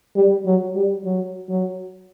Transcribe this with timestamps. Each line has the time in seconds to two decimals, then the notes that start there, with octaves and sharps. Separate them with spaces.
0.16 G3
0.46 F#3
0.75 G3
1.05 F#3
1.49 F#3